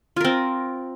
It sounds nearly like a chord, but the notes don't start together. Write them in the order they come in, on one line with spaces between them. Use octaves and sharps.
F4 A#4 C4